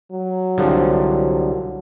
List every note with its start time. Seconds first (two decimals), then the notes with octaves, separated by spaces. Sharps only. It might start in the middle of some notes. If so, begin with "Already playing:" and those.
0.11 F#3
0.58 C2 D3 F3